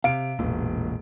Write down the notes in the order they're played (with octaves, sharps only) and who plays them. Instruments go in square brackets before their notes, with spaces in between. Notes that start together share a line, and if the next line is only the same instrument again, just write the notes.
[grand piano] C3 D7 [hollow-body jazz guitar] F5
[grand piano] E1 [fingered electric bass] A1 A#2